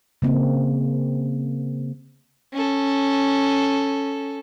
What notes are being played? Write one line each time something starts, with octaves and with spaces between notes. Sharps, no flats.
C#3 A#3 C4
C#4 A4